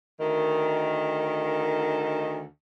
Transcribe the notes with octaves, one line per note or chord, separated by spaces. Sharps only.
D2 D#3